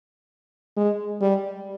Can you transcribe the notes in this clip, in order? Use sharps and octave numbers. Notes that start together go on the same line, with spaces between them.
G#3
G3